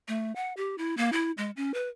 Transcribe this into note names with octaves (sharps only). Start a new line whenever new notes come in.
A3
F#5
G4
E4
A#3
E4
G#3
C#4
B4